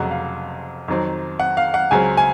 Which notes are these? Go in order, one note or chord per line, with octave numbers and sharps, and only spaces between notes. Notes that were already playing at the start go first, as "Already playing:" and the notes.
Already playing: F1 F2 C#3 F#3 F#5
F5
F2 D#3 F#3 C4
F#5
F5
F#5
C#2 C#3 F#3 C4 G#5
G#5